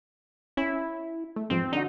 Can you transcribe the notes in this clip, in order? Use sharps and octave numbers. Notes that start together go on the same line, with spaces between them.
C#4 E4
A3
E2 G#2 F3 C4
D3 D4 D#4 F#4